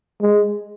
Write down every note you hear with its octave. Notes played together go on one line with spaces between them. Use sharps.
G#3